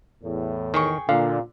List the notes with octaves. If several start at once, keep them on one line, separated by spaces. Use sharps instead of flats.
E2 A2
D#3 G#4 G5 C#6
A#2 D3 F5